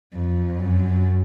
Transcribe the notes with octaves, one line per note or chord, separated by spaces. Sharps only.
F2
F#2